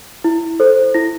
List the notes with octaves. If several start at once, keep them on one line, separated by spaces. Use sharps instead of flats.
E4
A4 C5
E4 A#6